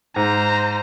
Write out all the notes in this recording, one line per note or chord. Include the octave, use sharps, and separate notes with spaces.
G#2 C5 A#5